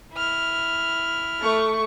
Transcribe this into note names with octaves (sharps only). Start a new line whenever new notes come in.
E4 F6
A3 C#6